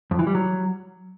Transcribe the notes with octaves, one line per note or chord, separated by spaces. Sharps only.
F2
E3
G3
F#3